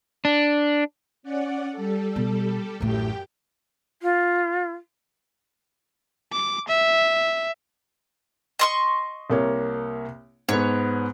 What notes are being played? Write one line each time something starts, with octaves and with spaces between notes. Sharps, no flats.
D4
C#4 D5 F#5
G3 A4
B2
A1 F#2 A2 G4 G5
F4
D6
E5
D#5 C6 C#6
C2 A#3 C#5
G#2 B3 C#5